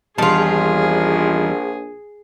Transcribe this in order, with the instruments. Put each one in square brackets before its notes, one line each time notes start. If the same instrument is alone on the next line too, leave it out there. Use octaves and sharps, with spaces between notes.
[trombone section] A#1 [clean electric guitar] E2 G3 A5 [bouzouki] D#3 F4 [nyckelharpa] G#4